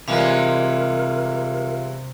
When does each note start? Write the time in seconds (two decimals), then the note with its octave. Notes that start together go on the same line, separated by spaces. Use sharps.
0.08 C3 E3 G3 G#3 F4 A#4 E5 F5